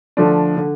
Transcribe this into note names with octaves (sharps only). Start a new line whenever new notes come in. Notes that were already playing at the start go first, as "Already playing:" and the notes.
D3 F3 A3 D4
D3